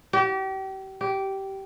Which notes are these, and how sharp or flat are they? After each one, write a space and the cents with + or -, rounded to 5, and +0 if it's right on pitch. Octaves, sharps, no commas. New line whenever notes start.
G4 -35
G4 -15